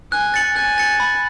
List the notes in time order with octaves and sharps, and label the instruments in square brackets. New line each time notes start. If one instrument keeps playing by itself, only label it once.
[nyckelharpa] G#5 [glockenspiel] F#6
[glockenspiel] A6 C#7 F#7
[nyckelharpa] G#5 [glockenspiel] F#6
[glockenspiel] A6 C#7 F#7
B5